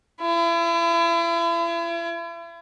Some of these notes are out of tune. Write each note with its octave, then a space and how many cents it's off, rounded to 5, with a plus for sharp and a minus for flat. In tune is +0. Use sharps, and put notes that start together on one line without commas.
E4 +40